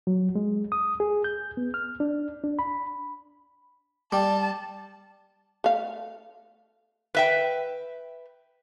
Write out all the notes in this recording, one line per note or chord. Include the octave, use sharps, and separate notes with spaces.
F#3
G#3
D#6
G#4
G6
B3
F6
D4
D4
B5
G3 A5
A3 F5
B4 E5 G5